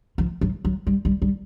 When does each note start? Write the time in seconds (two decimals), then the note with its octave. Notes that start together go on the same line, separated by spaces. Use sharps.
0.18 F3
0.41 F#3
0.65 F#3
0.87 G3
1.05 G3
1.22 G3